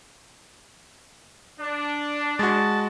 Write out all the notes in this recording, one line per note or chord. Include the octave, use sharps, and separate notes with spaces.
D4
G#3 F#4 A5